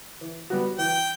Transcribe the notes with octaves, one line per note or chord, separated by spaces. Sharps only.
E3
G3 B3 F#4
E3 G5